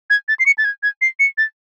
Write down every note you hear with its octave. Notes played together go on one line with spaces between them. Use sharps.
G#6
A6
C7
C#7
A6
G#6
G#6
C7
C#7
A6